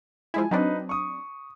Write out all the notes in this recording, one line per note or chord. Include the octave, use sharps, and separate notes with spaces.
F3 G#3 E4 G#5
F#3 C4 D4 D#4 B4
C#6 D#6